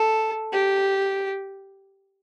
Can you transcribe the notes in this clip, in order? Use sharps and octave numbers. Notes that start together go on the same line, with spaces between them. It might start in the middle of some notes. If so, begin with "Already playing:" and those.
Already playing: A4
G4